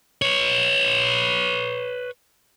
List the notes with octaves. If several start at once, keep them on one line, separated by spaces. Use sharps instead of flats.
B4 C#5